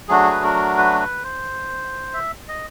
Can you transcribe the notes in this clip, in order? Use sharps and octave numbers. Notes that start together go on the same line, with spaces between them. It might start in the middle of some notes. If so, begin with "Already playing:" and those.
F#3 A3 D4 F#4 G#4
B4
A#4
B4
B4
C5
E5
D#5